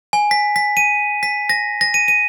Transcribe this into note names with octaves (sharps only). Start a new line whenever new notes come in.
G#5
B6
B6
D#7
B6
A#6
A#6
D#7
D#7